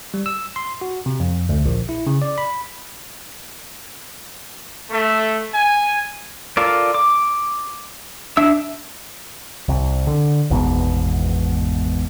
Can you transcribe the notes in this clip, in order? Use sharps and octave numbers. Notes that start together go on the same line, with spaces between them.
G3
E6
C6
F#4
C3
F2
D2
A#1
E4
C#3
D5
B5
A3
G#5
F4 A4 A#4 D5
D6
D4 E5 E6
C2
D3
G#1 E2 G#2 B2